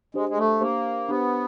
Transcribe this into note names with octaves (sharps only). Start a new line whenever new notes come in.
G#3 D4 G4 C5
G#3
A3
A#3 D4 G4 C5
B3 D4 G4 C5